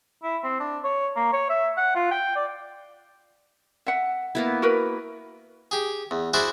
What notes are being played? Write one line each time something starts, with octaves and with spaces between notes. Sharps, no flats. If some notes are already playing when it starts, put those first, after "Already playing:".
E4
C4
D4
C#5
A#3
C#5
E5
F#5
F4
G5
D5
E5 F#5
A#3 B3 E4
F#4 A#4 B4
G4 G#4
E2
E4 F#4 G#4 C5 D5 F#5